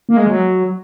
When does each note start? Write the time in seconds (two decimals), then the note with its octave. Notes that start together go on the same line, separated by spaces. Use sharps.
0.09 A#3
0.17 G#3
0.26 F#3